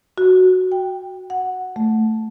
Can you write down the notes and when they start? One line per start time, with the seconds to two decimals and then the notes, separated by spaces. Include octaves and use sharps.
0.18 F#4
0.72 G5
1.30 F#5
1.76 A3